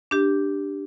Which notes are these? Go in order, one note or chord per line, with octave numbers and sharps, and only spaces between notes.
D4 G4